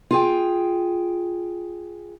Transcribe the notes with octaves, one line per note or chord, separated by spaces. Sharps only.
F4 G#4 G5